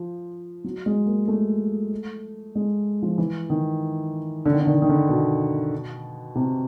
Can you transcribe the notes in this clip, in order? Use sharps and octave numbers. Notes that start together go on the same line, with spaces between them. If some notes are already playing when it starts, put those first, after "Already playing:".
Already playing: F3
F#3
G#3
A#3
A3
G#3
F3
E3
D#3
D3
D#3
D3
D#3
D3
D#3
D3
B2
C3